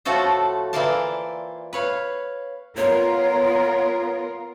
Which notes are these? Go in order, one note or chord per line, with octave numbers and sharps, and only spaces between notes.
A2 F3 A3 F#4 A4 C5
A#2 E3 C5 D5 F5 A5
B4 C#5 F5
B3 F4 A#4 C#5